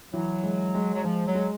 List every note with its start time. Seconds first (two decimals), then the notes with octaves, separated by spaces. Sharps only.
0.13 E3 F#3
0.44 G#3
0.75 G#3
0.94 F#3
1.04 F3 G#3
1.27 F#3
1.35 G#3